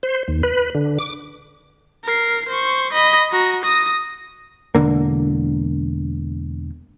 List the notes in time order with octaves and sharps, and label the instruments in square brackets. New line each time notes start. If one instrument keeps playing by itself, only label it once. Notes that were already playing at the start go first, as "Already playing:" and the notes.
[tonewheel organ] C5
D#2
B4
D3
D6
[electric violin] A#4 C7
C5 C#6
D#5 B5
F#4 A#5
D#6 A#6
[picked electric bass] E1 D3 A#3